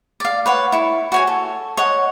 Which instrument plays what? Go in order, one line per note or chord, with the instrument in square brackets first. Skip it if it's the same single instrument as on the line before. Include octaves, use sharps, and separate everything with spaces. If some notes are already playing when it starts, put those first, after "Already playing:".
[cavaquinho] D5 F5
B4 C#5 F#5
E4 C#6
F#4 C#5 G#5
A4
C#5 D#5 F#5